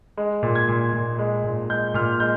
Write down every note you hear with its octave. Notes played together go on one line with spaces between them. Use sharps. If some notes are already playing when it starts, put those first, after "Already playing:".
G#3
A#2
G#6
A#2
A#2
G#3
A#2
G#3 G6
A#2 F6
G#3 G6